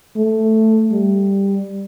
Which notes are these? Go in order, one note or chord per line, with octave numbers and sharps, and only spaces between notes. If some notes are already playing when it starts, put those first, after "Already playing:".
A3
G3